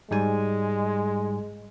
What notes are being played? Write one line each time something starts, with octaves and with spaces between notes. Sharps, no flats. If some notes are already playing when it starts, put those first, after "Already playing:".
G#2 G3 G#3 G#5